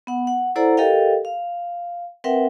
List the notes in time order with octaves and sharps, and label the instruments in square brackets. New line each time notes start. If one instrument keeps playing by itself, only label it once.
[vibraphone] B3 F#5
F#5
E4 A4 C5 D5 F#5 A#5
G4 A4 A#4 D#5 F5 G5
F5
C4 A#4 B4 E5 F#5 G5